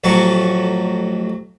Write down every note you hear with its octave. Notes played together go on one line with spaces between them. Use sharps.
A1 F2 F#3 A5 C#6